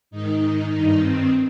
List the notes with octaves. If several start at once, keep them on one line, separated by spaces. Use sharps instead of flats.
G#2 D#3 D#4
G2 D#3 D#4
C4